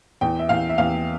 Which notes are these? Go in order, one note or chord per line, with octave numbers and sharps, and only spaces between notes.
E2 G5
E5
E2 F5
E5
E2 F5